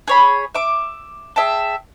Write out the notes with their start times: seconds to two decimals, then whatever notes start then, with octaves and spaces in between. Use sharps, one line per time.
0.08 G#4 C#5 B5
0.54 E5 D6
1.36 G#4 E5 G5 A5